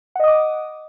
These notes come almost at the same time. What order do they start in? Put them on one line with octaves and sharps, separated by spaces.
F#5 D#5 D#6 D6